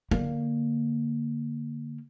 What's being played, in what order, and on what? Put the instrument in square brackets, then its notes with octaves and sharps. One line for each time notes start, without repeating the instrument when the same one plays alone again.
[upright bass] D3 A#3